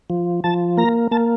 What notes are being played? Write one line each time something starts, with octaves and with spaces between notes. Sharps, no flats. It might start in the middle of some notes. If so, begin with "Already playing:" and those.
F3
F3 A5
A#3 A#5
A#3 A5